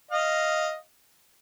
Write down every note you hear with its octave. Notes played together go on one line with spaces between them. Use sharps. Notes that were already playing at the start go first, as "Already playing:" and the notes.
D#5 F5